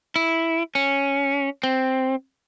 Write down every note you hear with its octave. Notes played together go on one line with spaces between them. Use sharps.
E4
C#4
C4